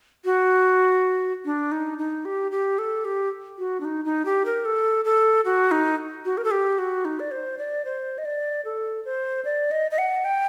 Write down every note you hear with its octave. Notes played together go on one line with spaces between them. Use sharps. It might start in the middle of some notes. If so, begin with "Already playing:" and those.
F#4
D4
D#4
D#4
G4
G4
A4
G4
F#4
D4
D#4
D#4
G4
A#4
A4
A4
F#4
D#4
F#4
A#4
A4
G4
F#4
D#4
D5
C5
D5
C5
D#5
D5
A4
C5
D5
D#5
D#5
F#5
G5